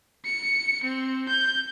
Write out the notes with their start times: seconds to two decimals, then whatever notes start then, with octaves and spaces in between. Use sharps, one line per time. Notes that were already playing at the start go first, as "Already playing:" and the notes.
0.25 C#7
0.83 C4
1.28 G6